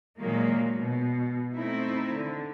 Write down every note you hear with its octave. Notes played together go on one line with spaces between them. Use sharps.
A#2 D#3 F#3 G#3 A#3
B2
A3 C4 D#4 E4
D3